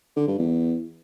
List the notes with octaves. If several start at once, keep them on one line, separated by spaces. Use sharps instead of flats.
D3
G2
E2